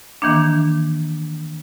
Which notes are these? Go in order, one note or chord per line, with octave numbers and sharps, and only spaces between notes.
D#3 E3 A#3 D4